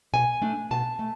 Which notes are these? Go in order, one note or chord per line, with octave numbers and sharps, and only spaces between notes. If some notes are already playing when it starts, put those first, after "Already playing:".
B2 G#5
A3 D4
B2 A5
A3